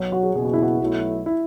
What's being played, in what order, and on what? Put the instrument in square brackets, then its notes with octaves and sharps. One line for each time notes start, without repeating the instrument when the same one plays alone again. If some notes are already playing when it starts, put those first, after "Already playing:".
Already playing: [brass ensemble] B1 B2 F#3
[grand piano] F#4
G#4
[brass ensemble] F#1 E2 B2 [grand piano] G#4
[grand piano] F#4
E4
F#4
[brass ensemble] B1 B2 F#3 A3 E4
[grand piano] E4